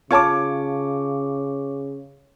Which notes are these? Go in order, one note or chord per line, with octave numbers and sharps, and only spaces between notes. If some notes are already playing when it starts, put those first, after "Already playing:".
C#3 F4 C#5 A5 C#6 D6